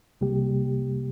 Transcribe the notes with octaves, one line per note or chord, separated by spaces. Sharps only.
C2 C3 G3 A#3 G4